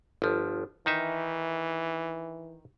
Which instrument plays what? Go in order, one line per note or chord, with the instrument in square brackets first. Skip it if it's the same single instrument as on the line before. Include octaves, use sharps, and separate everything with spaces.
[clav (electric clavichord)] G1 F3
[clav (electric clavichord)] D#3 D#4 E5 [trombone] E3